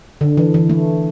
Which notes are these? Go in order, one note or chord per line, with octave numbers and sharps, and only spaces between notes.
D3
E3
E3
A3